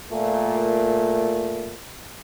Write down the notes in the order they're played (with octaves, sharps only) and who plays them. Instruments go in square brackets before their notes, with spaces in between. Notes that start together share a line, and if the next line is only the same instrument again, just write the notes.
[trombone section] A#2 A3